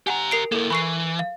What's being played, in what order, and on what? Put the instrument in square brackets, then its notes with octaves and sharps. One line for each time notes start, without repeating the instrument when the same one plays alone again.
[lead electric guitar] G4 A#5 [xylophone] F#5 G#5
[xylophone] A#4 C7 D7
[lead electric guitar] A#3 E4 [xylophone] A4 A#4
[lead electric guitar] E3 [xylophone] B5 C#6 C7
[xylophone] F5